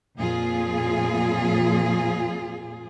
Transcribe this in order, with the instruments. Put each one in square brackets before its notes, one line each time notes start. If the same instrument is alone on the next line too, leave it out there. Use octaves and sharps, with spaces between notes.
[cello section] F2 A#2 F3 F4 G#4